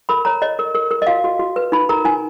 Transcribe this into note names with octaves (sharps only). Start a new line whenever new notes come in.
A#4 B5
C#5 A#5
C#5 D#5
A#4
A#4
A#4
D#5
F#4 F5
F#4
F#4
B4
D#4 B5
A#4 A#5
D#4 G#5